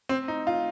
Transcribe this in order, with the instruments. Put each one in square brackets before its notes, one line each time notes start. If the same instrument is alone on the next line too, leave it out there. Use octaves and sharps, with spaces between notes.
[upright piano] C4
D#4
F4